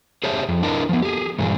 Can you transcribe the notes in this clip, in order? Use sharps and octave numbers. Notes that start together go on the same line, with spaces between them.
G4 G#4 C5 C#5 E5 A5
F2
D4 E4 A#4 D#5 A5
F3 B3
G4 G#4
G2 A#2 E3 G#4